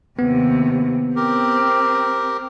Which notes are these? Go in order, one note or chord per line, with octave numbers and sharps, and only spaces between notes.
D#2 C3 B3
C4 G4 A#4